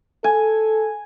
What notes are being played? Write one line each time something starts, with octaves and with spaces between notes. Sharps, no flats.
A4 G#5